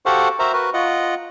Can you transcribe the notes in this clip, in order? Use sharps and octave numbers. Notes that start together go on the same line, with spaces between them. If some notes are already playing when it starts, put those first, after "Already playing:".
F#4 G4 A4 C5 F5 F#5
F#4 A#4 C5 E5 A#5
F#4 A#4 B4
F4 D#5 F#5